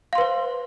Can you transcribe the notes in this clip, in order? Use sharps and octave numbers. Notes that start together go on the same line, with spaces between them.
B4 C5 F5 C6